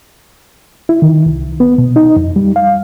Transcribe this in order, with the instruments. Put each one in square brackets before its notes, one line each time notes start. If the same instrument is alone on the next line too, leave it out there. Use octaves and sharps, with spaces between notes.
[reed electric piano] E4
D#3
C2
B3
B2
D#4
F2
G3
F5